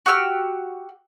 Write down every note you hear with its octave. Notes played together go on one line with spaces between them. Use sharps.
F#4 G4 E6 F6